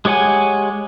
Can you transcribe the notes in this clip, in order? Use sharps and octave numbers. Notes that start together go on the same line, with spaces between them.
G#3 G4 C#5 F#5 G#5